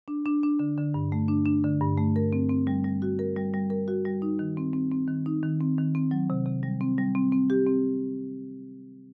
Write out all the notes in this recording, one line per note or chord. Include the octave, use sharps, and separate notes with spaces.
D4
D4
D4
D3
D3
G2
A3
D4
D4
D3
G2
A3
A#4
C4
C4
G3
G3
F#4
A#4
G3
G3
A#4
F#4
G3
D#4
D#3
C4
C4
C4
D#3
D#4
D#3
C4
D#3
C4
F#3
C3
C3
G3
C4
G3
C4
C4
G4
C4